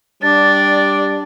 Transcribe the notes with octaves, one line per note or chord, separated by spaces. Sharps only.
G3 D4 D5 A6